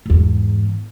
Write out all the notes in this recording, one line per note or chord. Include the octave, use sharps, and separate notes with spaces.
E2 G#2